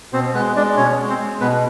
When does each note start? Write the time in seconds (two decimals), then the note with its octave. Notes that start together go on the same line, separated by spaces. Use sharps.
0.13 B2 C4 C5
0.34 G#3 B3 B4
0.56 G#3 D4 D5
0.77 B2 C#4 C#5
0.98 G#3
1.09 C4 C5
1.20 G#3
1.41 B2 B3 B4